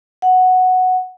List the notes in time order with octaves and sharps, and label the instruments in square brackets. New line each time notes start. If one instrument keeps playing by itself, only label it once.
[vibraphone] F#5